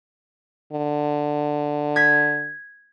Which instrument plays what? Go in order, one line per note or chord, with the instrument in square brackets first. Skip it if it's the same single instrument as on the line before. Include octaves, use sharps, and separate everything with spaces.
[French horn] D3
[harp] G#6 B6